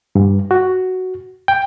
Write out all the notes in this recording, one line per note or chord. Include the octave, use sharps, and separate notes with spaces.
G2
F#4
G5